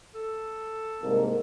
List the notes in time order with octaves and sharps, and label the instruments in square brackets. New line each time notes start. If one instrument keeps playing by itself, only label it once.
[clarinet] A4
[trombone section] C2 G#2 A#3